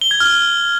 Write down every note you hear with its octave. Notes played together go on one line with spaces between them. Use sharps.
G7
G#6
F6